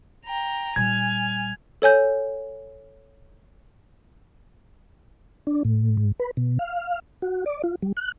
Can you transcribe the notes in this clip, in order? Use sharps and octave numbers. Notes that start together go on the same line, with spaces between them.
G5 A#5
A#2 G3 G#5 F6 G#6
A4 C#5 G#5 G6
D4
A2
G#2
B4
B2
F5
F#4
D5
F4
G3
F#6